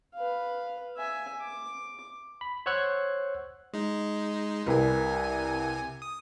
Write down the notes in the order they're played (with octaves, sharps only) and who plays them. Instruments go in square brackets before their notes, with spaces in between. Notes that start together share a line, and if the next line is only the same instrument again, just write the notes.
[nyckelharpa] B4 F5
E5 G#5
D6
[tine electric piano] B5
C5 C#5 F#5 E6 F#6 G#6
[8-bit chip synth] G#3 D#4
[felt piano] C2 A#4 B4 [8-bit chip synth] C3 G#5
[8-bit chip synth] D#6